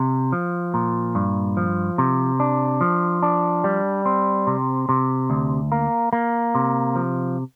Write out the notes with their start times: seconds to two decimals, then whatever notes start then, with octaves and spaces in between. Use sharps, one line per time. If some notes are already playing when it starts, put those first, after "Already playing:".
Already playing: C3
0.32 F3
0.74 A#2
1.15 G2
1.57 F3
1.98 C3
2.40 D4
2.81 F3
3.23 D4
3.64 G3
4.06 C4
4.47 C3
4.89 C3
5.30 D2
5.72 A#3
6.13 A#3
6.55 C3
6.96 F3